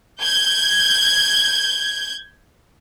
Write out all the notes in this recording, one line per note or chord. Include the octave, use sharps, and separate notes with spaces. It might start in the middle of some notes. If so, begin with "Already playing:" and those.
G6 G#6